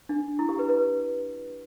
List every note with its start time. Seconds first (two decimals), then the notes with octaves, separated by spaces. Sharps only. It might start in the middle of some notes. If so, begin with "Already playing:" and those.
0.09 D4
0.39 E4
0.49 G4
0.59 B4
0.69 B4